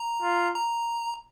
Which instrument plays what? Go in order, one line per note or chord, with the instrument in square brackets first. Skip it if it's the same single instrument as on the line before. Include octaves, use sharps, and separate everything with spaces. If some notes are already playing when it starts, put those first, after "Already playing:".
Already playing: [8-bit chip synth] A#5
[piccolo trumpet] F4
[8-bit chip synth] A#5